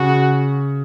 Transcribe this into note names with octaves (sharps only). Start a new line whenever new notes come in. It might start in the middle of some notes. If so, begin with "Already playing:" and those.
Already playing: C#3 F#4